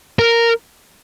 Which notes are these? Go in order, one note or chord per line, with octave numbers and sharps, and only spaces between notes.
A#4